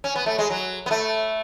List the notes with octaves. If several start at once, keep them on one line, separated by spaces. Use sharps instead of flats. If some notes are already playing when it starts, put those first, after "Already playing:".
C#4
B3
A3
G#3
F#3
B3
A3